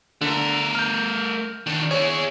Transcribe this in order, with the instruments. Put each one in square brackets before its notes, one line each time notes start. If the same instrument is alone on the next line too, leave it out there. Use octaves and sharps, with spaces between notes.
[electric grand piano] D3 [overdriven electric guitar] A3 A#4
[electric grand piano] F6 G6
[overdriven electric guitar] D#3 D4
[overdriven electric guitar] E4 G#4 [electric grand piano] C#5